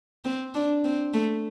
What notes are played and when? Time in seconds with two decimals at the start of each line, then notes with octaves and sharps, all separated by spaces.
0.25 C4
0.54 D4
0.84 C4
1.13 A3